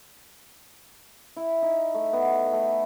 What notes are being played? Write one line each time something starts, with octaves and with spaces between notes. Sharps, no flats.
E4
D#4
A3
B3
A3